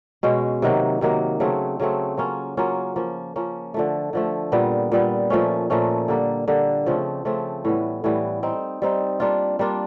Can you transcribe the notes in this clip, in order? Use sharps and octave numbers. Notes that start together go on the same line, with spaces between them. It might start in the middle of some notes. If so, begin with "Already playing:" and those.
B2 G#3 C#4
C3 D#3 F#3 A#3
C3 D#3 F#3 A#3
C#3 F#3 A3 C4
C#3 F#3 A3 C4
F#3 A#3 C#4 F4
F#3 A#3 C#4 F4
F3 A#3 C#4
F3 A#3 C#4
D3 F3 A3
D3 F3 A3
A#2 G3 B3
A#2 G3 B3
A#2 F3 A3 C#4
A#2 F3 A3 C#4
D3 G3 A#3
D3 G3 A#3
C#3 F3 A3 C4
C#3 F3 A3 C4
A2 E3 G3 B3
A2 E3 G3 B3
G3 C4 D#4
G3 C4 D#4
G3 A#3 D4 F4
G3 A#3 D4 F4